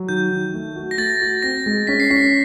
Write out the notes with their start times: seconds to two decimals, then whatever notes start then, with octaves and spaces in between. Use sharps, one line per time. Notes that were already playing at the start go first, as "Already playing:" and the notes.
Already playing: F#3
0.09 D#3 G6
0.31 D#3
0.54 A3
0.76 F#4
0.91 A#6
0.98 A3 A6
1.21 F#4
1.42 C4 A#6
1.66 G#3
1.87 C#4 B6
2.00 C7
2.10 C#4 B6